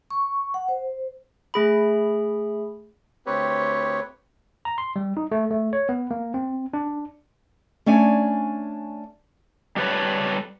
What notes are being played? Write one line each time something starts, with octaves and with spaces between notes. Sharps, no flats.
C#6
F#5
C5
A3 G#4 B5
D2 C4 G4 B4 C#5
A#5
C6
G3
D#4
A3
A3
C#5
B3
A#3
C4
D4
A3 C#4 D4 D5 G#5
G3 G4 A4 B4 C#5 D5